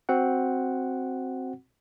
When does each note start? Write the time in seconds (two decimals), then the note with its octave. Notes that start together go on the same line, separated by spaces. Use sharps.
0.09 C4 F#4 F#5